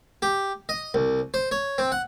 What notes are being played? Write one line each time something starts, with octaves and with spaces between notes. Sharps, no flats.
G4
D#5
C2
C5
C#5
C4
F#5